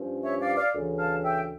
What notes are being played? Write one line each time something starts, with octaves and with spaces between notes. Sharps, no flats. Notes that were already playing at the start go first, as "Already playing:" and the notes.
Already playing: G2 F3 C#4
C#5 E5
D5 F5
D5 F5
D2 C#3 E3
F5 A5
E5 G5